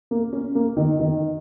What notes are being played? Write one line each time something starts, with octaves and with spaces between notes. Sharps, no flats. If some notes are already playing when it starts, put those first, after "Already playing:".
A#3
C#4
A#3
D#3
D#3